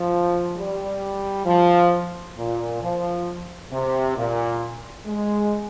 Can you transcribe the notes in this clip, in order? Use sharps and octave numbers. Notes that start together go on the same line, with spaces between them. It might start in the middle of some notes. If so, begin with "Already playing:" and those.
Already playing: F3
G3
F3
A#2
F3
C3
A#2
G#3